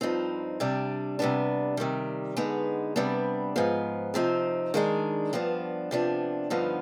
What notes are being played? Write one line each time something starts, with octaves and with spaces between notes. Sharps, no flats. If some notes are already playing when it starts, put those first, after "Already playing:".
G2 F3 C4 D#4
C3 G3 D4
C3 G3 B3 D4
C3 D#3 G3
D3 G#3 B3 D#4
C3 G3 B3 D4
G#2 F3 B3
C3 F3 C4 D#4
D#3 G#3 D4
G2 F3 B3 D4
C3 F3 B3 D4
G2 D3 F3 B3 D#4